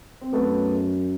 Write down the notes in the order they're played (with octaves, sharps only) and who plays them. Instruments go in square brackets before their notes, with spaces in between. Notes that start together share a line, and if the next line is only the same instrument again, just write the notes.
[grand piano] C4
[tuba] F#2 [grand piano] A3 B3